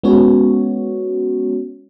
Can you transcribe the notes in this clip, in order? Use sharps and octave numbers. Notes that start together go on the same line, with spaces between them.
G#3 B3 C#4 F#4 C#5